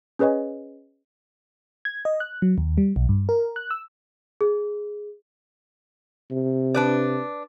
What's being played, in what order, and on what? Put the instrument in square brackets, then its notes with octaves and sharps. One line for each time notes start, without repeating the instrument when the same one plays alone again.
[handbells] C#4 G#4 B4 C#5 D#5 G#5
[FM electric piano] G#6
D#5
F#6
F#3
D#2
G3
B1
G2
A#4
F#6
E6
[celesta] G#4
[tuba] C3
[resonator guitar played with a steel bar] D4 B4 D5